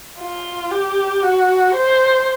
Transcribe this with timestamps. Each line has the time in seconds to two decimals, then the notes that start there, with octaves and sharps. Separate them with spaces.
0.19 F4
0.71 G4
1.23 F#4
1.75 C5